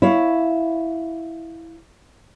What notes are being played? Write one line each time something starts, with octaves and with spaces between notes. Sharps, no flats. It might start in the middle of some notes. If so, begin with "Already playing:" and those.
E4 C#5 F5